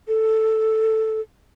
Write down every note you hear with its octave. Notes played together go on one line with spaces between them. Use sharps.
A4